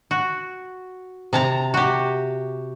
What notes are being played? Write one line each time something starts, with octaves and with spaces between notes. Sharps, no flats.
F#4
C3 A5 A#5
F#4 G4